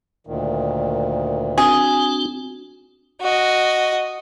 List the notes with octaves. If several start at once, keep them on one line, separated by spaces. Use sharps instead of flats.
D2 A#2 D#3
C4 D4 F#4 G#4
F#4 D#5